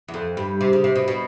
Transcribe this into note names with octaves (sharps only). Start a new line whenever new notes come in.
E2
F2
G2
C3
C#3
C3
B2
B2